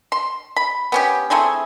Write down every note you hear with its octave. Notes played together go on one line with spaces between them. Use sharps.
C6
B5
B3 C#4 G4
A3 C4 E4 G#4